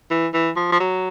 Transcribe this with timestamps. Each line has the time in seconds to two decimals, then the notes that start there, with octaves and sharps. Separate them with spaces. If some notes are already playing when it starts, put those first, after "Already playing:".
0.11 E3
0.34 E3
0.56 F3
0.72 F3
0.80 F#3